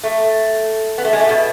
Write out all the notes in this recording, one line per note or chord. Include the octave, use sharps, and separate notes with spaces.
A3
B3
A3
G#3
A3
B2